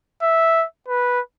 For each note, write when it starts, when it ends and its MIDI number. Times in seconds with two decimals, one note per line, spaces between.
0.22 0.66 76
0.88 1.20 71